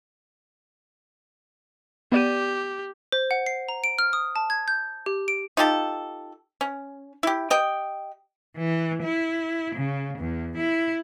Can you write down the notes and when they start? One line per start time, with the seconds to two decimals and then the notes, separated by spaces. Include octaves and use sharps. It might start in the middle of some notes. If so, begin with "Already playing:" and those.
2.12 B3 G4 D5 D#7
3.12 C5
3.31 F#5
3.46 C7
3.69 A#5
3.84 D7
3.99 F6
4.13 D#6
4.36 A5
4.50 G#6
4.68 G6
5.06 G4
5.28 D7
5.57 D#4 F4 G4 A4
6.61 C#4
7.23 E4 G4
7.50 G4 D#5 G5
8.56 E3
9.02 E4
9.73 C#3
10.19 E2
10.57 E4